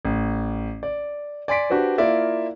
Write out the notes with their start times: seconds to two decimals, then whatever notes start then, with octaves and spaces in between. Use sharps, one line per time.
0.05 A1
0.83 D5
1.48 D5 G#5 C6 B6 D7
1.70 D4 F#4 G4 B4 C5
1.98 A#3 E4 F4 A#4 D5 E5